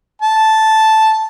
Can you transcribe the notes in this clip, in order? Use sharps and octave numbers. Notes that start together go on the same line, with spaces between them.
A5